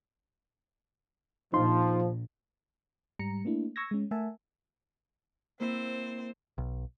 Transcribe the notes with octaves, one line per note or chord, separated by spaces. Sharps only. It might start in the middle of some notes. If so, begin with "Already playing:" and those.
A#1 F3 D#4 C6
G#2 G3 A#5 C#7
A3 A#3 D4 E4
C#6 E6 G#6 A#6
G#3 C#4
A3 A#4 E5 F#5 G#5 A5
A#3 C4 E4 C5
B1